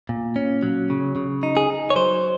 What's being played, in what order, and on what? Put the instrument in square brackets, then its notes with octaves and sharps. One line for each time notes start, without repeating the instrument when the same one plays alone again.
[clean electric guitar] A#2
C#4
F#3
C#3
C#3
D#4
G#4
D#4
C#5
F#3 C5